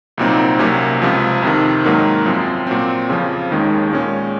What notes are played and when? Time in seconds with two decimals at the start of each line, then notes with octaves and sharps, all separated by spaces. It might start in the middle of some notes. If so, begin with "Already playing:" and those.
0.18 C2 A#2 F#3 C4 D#4
0.59 C2 C3 F#3 A#3 C#4
1.02 C#2 C3 F3
1.42 F2 C3 D#3
1.85 G#2 D#3 F#3 A#3 D#4
2.26 F#2 F3 C4
2.67 A#2 F#3 C4
3.09 F2 C#3 F3
3.51 D#2 D#3 G#3 C#4
3.92 A#2 G#3 C#4